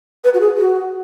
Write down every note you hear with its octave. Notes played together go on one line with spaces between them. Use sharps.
B4
F#4
G#4
F#4